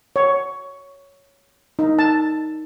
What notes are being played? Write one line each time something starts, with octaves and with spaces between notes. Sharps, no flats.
C#5
D#4
A5